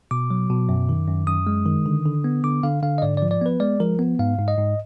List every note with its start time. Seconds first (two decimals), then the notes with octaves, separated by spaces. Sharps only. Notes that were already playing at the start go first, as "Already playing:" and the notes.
0.11 B2 D6
0.30 F#3
0.50 B2
0.69 F#2
0.89 D#3
1.08 F#2
1.27 F#2 D#6
1.47 G#3
1.66 D#3
1.86 D3
2.06 D3
2.24 B3
2.44 D3 D6
2.63 D3 F5
2.83 D3 F5
2.98 D#5
3.02 G#2 D5
3.17 D5
3.22 F3
3.31 D5
3.41 B3 B4
3.60 G#3 D5
3.80 F3 A#4
3.99 B3
4.19 G#2 F5
4.38 G#2
4.48 D#5
4.58 G#2